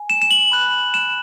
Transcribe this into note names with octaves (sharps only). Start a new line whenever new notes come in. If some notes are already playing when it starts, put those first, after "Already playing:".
Already playing: G#5
E7
E7
F#7
B5 F#6
E7